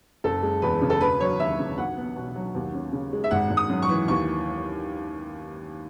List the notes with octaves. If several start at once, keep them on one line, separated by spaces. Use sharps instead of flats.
F#1 A4
G#3
E2 B4
C#3
A4
E1 B4
F#3 C#5
D#2 E5
C#3
B1 F#5
B3
B2
F#3
D#2
C#4
C#3
G#3
E5
G#1 F#5
G#1
D#6
F#2
C#6
E3
D#2 C#6